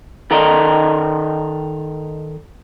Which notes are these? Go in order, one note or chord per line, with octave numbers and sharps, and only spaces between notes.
D#3 A4 A#4 D5 D#5